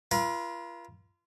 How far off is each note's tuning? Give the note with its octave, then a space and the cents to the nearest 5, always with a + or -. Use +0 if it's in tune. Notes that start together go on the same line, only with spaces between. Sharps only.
F4 -30 A#4 +45